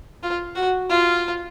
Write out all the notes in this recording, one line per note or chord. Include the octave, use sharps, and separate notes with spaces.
F4
F#4
F4